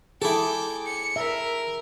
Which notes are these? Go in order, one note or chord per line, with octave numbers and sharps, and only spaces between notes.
E4 G#4 A4 G5 D6
C#7
A#4 E5